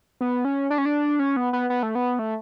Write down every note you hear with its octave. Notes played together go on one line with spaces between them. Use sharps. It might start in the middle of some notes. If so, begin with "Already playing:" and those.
B3
C#4
D4
C#4
D4
C#4
B3
B3
B3
A3
B3
A3